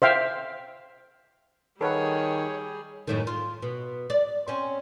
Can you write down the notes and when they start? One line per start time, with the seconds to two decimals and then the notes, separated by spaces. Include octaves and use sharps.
0.02 C5 E5 F5 G5
1.81 D#3 G3 G#4 A4 B4 C#5 F#5
3.07 F#2 A2 D#3
3.27 F4
3.62 B2
4.10 D5
4.48 C4 C#4